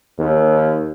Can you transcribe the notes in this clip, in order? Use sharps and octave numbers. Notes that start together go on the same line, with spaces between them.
D#2